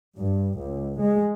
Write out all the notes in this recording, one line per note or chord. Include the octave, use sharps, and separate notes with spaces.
G2
C#2
G#3